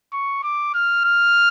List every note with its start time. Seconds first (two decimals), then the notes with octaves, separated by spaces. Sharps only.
0.13 C#6
0.43 D6
0.74 F6
1.05 F6